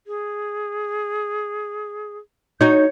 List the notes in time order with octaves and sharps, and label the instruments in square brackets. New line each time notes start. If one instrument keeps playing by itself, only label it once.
[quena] G#4
[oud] D#4 F#4 [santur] C#5 [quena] G6